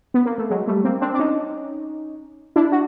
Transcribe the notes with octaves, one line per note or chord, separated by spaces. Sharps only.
B3
A#3
A3
F#3 G#3
G3 A3
A#3 C4
C4 D4
D4
C#4 D#4
D4 E4
F#4